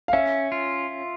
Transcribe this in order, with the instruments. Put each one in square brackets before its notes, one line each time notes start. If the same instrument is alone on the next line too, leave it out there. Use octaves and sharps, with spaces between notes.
[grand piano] F5
[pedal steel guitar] C#4 [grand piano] E5
[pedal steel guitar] F4